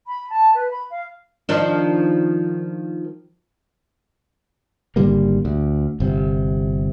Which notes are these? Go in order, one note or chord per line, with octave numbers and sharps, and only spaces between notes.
B5
A5
B4
B5
F5
D#3 F3 D4
G#1 D3 G3 A#3
D2
G1 C3